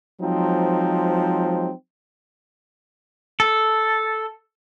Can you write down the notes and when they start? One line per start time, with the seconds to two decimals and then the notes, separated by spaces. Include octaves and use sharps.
0.21 F3 F#3 G#3 C4 D#4
3.40 A4